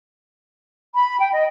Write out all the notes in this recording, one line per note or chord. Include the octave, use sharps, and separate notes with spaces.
B5
G5
D#5